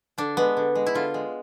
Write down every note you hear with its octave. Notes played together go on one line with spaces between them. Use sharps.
D3 D4
G#3 B3
D3
G#3
E4
D3 F4
G#3